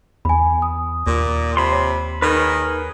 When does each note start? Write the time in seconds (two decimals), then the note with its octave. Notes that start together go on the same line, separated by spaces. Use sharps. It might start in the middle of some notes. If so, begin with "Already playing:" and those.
0.25 E2 G#5 B5
0.62 D#6
1.07 D#2 A#2
1.57 C3 B5 C6
1.72 C#5
2.22 D#3 G#4 A#4 B4